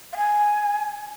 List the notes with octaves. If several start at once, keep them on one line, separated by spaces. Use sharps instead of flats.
F5
G#5